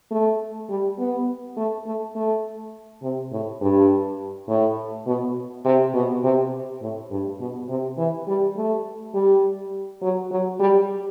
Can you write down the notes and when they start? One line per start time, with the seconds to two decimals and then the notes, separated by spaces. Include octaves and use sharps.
0.11 A3
0.70 G3
0.99 B3
1.57 A3
1.86 A3
2.15 A3
3.02 C3
3.32 A2
3.61 G2
4.48 A2
5.06 B2
5.65 C3
5.94 B2
6.23 C3
6.82 A2
7.11 G2
7.40 B2
7.69 C3
7.98 E3
8.27 G3
8.57 A3
9.14 G3
10.02 F#3
10.31 F#3
10.60 G3